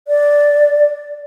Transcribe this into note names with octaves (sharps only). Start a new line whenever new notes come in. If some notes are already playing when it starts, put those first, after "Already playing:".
D5